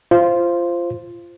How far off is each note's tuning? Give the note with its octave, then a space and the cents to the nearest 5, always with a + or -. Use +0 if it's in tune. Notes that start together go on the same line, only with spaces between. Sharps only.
F4 -15 C5 +0